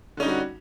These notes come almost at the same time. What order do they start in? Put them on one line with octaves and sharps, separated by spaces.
D3 C#4 D#4 G3 F#4